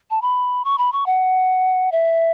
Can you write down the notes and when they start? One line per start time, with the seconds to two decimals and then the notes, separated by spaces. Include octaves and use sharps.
0.10 A5
0.22 B5
0.65 C#6
0.78 B5
0.93 C#6
1.06 F#5
1.92 E5